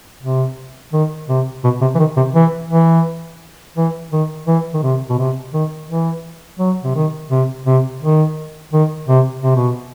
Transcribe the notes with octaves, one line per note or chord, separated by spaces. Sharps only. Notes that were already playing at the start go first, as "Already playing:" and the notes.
C3
D#3
C3
B2
C3
E3
D#3
C3
E3
E3
E3
D#3
E3
D#3
C3
B2
C3
D#3
E3
F#3
C3
D#3
C3
C3
D#3
D#3
C3
C3
B2